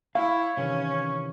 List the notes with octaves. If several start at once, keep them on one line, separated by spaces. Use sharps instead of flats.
E4 C#5 F5
C3 D#3 E3 C#4